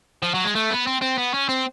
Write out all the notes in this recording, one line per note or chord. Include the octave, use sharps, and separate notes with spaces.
F3
F#3
G#3
A3
B3
C4
C4
B3
C#4
C4